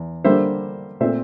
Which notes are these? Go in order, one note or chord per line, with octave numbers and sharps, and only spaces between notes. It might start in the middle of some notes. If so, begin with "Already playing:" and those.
Already playing: E2
D3 G3 A#3 C5 E5
A#2 A3 C4 C5 E5